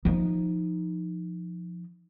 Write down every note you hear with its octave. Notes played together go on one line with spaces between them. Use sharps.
F3 D#4